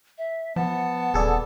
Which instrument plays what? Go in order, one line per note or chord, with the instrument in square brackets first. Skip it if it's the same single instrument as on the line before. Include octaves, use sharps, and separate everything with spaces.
[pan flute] E5
[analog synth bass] F3 [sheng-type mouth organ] B3 A5 [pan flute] F#5
[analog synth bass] D#1 [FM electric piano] G#4 A4 D5